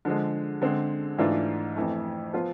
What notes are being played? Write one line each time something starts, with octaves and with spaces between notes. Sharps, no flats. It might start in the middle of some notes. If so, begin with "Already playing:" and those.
D3 F3 G#3
D3 G#3 C4
G#2 E3 A3 D4 F4
F2 E3 A3
F3 B3 F4